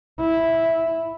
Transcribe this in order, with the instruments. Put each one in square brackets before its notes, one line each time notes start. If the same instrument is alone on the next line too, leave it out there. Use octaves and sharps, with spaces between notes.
[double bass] E4